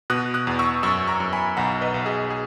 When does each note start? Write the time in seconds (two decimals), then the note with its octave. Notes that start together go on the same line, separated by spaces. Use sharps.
0.10 B2 D#6 F#6
0.34 D#6 F#6
0.47 E2
0.59 C#6 E6
0.83 F#2 C#6 E6
1.07 A#5 C#6
1.20 F#2
1.33 G#5 B5
1.57 B1 F#5 A#5
1.81 B4 D#5
1.94 B1
2.06 G#4
2.30 G#4